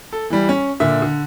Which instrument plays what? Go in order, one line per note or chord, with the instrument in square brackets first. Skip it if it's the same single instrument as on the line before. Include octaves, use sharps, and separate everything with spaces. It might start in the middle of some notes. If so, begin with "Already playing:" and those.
[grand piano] A4
E3 G3
C#4
A#2 D3 E5
D3